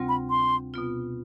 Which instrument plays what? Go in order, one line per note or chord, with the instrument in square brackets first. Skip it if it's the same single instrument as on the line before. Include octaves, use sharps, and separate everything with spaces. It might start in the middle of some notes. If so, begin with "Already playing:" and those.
Already playing: [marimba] D2 C3 G3 C4 F4
[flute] B5
C6
[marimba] B2 B3 F4